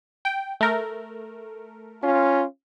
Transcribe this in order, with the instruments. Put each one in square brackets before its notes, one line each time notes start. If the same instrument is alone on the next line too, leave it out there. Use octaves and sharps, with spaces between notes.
[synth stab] G5
A3 A#4
[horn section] C#4 F4